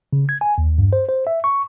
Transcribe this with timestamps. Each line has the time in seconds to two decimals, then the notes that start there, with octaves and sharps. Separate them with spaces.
0.13 C#3
0.29 G#6
0.41 G#5
0.58 D#2
0.78 G2
0.93 C5
1.09 C5
1.27 E5
1.44 C#6